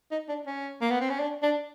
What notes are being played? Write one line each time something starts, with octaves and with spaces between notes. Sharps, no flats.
D#4
D4
C#4
A#3
B3
C4
C#4
D4
D4